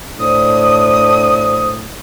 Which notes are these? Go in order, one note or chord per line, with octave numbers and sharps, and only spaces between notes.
A2 D4 C5 D#6